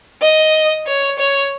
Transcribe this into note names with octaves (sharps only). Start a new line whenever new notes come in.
D#5
C#5
C#5